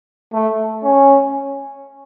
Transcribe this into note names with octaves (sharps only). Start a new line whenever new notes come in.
A3
C#4